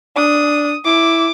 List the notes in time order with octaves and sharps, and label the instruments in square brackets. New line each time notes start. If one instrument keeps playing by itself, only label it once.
[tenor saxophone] D4 [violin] D#6
[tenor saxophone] E4 [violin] D6